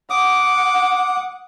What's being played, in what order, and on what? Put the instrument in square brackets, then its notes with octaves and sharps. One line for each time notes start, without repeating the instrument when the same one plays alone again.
[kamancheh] F#5 [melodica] D6 D#6